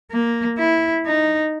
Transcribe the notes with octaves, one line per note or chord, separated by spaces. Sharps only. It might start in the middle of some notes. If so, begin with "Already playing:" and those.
A#3
E4
D#4